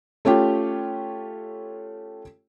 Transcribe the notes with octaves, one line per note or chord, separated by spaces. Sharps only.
A3 C#4 F4 G4